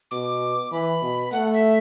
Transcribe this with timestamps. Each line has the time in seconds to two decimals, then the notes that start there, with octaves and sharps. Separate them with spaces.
0.11 B2 D6
0.72 E3 B5
1.02 B2
1.32 A3 F#5
1.53 E5